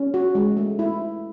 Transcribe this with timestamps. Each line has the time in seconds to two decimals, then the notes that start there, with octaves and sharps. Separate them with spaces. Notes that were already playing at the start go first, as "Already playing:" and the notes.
Already playing: C#4
0.14 F#4
0.35 G#3
0.57 A3
0.79 E4